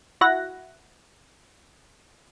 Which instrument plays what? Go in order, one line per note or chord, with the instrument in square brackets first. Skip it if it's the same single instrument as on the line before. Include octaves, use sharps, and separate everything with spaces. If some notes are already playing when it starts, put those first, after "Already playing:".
[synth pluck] E4 F#4 F#5 A#6